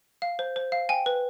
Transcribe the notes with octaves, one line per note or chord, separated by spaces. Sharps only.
F5
C5
C5
F5
G5 G#5
B4